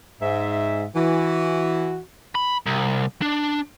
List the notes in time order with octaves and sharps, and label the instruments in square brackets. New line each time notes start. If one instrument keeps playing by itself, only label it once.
[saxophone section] G#2 E5
E3 F#4
[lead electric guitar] B5
C2
D4